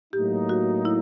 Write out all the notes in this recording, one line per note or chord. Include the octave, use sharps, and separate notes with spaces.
A2 F#3 A#3 D#4 G4
F#4
E4